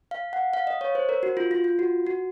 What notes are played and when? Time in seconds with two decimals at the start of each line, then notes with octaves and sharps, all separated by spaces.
0.11 F5
0.33 F#5
0.53 F5
0.67 D#5
0.81 C#5
0.95 C5
1.09 A#4
1.23 F#4
1.37 F4
1.51 F4
1.64 F4
1.79 F#4
2.07 F#4